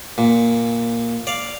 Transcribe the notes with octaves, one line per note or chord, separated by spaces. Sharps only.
A#2
D5 F5